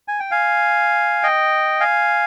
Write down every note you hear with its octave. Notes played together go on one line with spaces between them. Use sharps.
G#5
G5
F5 G#5
D#5 G5
F5 G#5